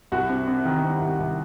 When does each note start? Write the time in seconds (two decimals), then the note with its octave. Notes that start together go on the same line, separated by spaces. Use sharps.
0.12 C2 F#4
0.30 C3
0.48 C3
0.65 D#3
0.84 C3
1.01 C2
1.19 C2